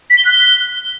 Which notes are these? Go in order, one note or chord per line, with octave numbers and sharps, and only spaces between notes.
B6
G7
F#6
G7